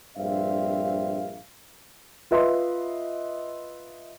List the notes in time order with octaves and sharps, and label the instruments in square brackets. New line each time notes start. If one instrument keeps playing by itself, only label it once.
[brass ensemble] A#1 G2 C4 E5 F5
[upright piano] F4 B4 D#5 E5 C6